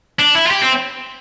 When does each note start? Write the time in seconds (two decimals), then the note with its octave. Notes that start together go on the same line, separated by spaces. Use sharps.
0.19 D4
0.35 E4
0.46 F4
0.51 G4
0.62 C4